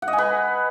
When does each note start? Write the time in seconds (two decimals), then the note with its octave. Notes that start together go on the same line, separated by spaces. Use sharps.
0.02 F#5
0.08 D#5
0.13 G#5
0.18 B4